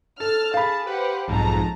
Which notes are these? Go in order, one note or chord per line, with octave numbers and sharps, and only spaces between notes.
A4 A5 F6
G#4 A4 F5 B5
G4 B4 C5 F#5
B1 F2 G#2 A5 A#5